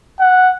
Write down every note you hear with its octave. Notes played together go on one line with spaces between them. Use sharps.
F#5